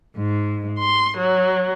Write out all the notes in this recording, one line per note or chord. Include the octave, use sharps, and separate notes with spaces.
G#2
C6
F#3